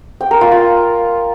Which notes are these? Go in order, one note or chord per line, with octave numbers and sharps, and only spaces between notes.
G5
A#4
F4
F4